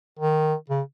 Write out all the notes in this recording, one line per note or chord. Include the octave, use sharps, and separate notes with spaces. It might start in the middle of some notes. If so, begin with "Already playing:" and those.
D#3
C#3